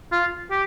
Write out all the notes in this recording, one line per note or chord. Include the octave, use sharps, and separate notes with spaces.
F4
G4